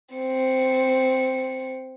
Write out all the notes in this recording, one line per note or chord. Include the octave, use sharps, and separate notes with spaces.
C4 C#7